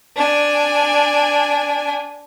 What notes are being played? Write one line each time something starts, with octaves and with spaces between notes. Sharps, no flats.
D4 G#5